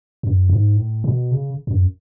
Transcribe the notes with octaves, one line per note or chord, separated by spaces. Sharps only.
F#2
G#2
A2
B2
C#3
F#2